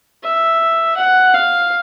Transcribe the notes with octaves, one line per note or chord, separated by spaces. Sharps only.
E5
F#5
F5